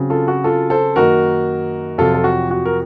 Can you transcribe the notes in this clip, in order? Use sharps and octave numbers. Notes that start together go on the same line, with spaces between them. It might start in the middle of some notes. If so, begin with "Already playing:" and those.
Already playing: C#3 F#3 C4
F4 A4
F#4
F4 A4
A4 C5
F#2 D#3 A#3 D#4 F#4 A#4
F2 C3 F#3 F4 A4
A4
F#4
F#4
A#4